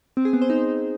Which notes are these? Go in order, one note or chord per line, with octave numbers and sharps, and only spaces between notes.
C4
G#4
B3
C5
D#4